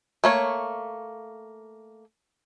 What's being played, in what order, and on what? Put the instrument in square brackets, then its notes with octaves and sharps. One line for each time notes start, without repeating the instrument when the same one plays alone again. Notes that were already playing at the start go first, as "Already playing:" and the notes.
[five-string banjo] A3 A#3 C#5